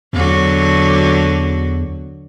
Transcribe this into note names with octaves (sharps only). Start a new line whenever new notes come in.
E2 D3 F#3 F#4